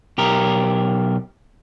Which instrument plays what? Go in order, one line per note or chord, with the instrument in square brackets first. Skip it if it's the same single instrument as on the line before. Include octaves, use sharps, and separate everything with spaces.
[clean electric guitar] B1 G4 A#4